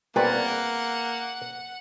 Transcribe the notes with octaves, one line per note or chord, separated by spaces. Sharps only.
C2 B2 A#3 C4 G#4 B4 D5 F#5